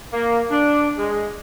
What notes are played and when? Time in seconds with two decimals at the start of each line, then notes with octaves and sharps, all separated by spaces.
0.13 A#3
0.51 D4
0.98 G#3